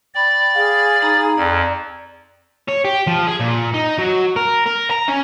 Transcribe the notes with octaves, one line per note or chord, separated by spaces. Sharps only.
D5 G5 B5
G#4 F5
D#4 A#5 B5
F2 D5 A#5
C#5
G4
F3
G#4
A#2
D#4
F#3
A#4
A#4
A#5
C#4